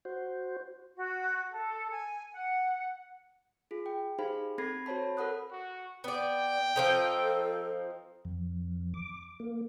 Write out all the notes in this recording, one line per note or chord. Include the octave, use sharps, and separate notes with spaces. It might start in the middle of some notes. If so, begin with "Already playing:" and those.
F#4 C5
F#4
A4
G#5
F#5
F4 G#4
G5
D#4 G4 G#4 C5 F5 B5
C4 A4 B5 G#6 A#6 C7
F#4 C5 C#5 A5 B5
A4 A#4 F#5 B5 D#6 F#6
F#4
B3 D5 G5
F3 C4 D#4 A4
F2
D6
A#3